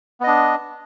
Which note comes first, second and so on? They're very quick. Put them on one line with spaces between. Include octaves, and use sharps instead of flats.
B3 D#5 D4